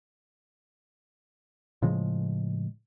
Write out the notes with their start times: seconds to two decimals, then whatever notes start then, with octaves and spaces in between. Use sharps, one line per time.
1.82 A2 C#3 F3 G#3